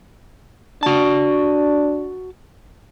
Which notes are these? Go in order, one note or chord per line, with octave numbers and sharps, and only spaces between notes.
D4 F#4 A5